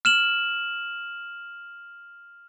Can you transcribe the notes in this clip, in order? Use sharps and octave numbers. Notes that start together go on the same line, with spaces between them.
F6 E7 F#7